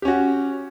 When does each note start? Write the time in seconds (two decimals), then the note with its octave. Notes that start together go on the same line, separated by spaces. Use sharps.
0.02 G4
0.05 C#4
0.08 F#4